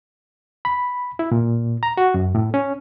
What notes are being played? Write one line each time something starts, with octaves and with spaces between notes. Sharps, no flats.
B5
E4
A#2
A#5
F#4
F#2
A2
C#4